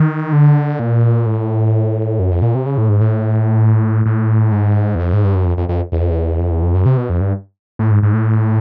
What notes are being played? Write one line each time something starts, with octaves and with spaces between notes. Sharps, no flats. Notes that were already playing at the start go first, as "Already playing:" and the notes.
Already playing: D#3
D3
A#2
A2
F#2
F2
A#2
C3
C#3
A2
G#2
A2
A2
G#2
E2
F2
G#2
G2
F#2
F2
F2
F2
E2
F2
E2
F2
E2
F2
F#2
C3
B2
F2
G2
A2
G#2
G#2
A2